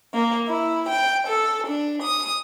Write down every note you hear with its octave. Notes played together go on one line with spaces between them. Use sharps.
A#3
E4
G5
A4
D4
D#6